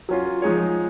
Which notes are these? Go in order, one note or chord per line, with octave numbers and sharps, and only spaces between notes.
F#3 C#4 F4
F3 G#3 D#4 G#4 C#5